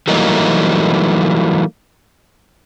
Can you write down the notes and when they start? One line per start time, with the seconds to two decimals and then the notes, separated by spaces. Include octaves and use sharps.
0.08 E3 F#3 G3 A3 A#3 D#4